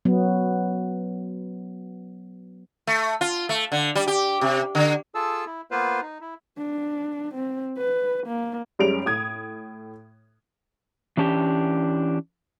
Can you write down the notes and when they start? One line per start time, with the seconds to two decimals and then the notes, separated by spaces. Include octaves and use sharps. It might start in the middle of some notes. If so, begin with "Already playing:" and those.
0.05 F#3 B3
2.87 A3
3.21 F4
3.49 A3
3.72 D3
3.95 G3
4.08 G4
4.41 C3
4.75 D3
5.15 F4 G#4 A4 A5 E6
5.46 E4
5.71 A#3 B3 F4 B4 C5 F5
6.02 D#4
6.21 E4
6.57 D4
7.34 C4
7.78 B4
8.26 A#3
8.79 F#2 G3 G#3 C#4 D7 F7
9.06 A2 D#6 G#6
11.17 E3 C#4 D4 G4